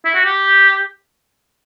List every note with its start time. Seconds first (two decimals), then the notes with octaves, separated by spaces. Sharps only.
0.05 E4
0.15 F#4
0.24 G4